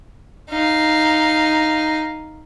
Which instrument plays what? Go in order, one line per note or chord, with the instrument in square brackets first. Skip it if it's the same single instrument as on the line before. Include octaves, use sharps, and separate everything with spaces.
[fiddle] D#4 F5